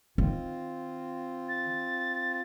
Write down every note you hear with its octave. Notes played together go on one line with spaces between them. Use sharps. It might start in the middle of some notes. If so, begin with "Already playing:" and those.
D#3 C4 F4
A6